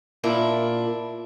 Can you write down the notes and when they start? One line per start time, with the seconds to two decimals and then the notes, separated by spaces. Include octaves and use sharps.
0.24 A#2 D4 E4